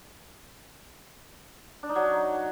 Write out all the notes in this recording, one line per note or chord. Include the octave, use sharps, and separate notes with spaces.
D4
D#4
F#3